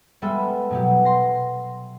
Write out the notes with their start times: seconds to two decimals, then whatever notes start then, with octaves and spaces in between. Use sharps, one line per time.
0.22 G3 G#3 B3 A4 E5
0.70 B2 F#3 G4
1.05 C6 A#6